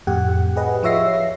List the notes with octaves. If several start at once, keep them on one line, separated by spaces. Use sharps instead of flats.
F2 A2 G4 F#5
G4 G#4 B4 D#5 F#5
F3 F4 C#5 E5 A#6 C7